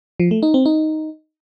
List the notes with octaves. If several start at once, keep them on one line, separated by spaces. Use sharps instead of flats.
F3
A3
D#4
C4
D#4